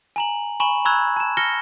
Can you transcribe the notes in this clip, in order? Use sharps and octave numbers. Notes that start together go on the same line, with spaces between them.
G#5 A#5 F#7
G#5 B5 C#6 E7 F#7
A#5 B5 C#6 E6 F#6 G#6
A5 E7
F6 A#6 C#7 G7